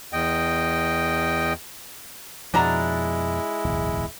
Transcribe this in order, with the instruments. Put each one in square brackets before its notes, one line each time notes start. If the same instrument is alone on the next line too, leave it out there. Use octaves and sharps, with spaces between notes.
[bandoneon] E2 D#5 G5
[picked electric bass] F2 B2 F3 [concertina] G#3 E4 [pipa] D4 F#4 A#5
[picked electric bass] D1 B1 E2